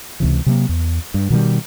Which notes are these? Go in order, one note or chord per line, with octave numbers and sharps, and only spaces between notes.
C#2 C3 E3
C3 F#3 A#3
E2
G2
B2 D#3 F3 G3